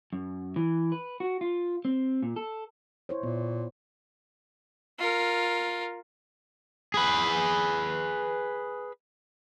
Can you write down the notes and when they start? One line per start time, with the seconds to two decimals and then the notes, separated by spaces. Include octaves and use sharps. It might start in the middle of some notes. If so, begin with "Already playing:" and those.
0.13 F#2
0.56 E3
0.92 B4
1.20 F#4
1.41 F4
1.85 C4
2.23 A#2
2.36 A4
3.09 E4 C5 C#5
3.23 A#2 B3
4.99 F4 A#4
6.94 G#4 B4